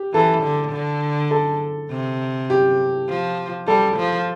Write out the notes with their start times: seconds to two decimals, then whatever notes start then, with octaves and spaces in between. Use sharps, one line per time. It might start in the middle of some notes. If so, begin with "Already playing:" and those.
Already playing: G4
0.13 E3 A4
0.43 D3
0.73 D3
1.31 A4
1.90 C3
2.50 G4
3.08 F3
3.67 G3 A4
3.97 F3